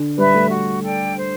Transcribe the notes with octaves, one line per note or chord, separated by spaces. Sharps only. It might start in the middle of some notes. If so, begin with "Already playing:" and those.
Already playing: D3
G3 B4 E5
A3
F#4
A4 D5 G5
C5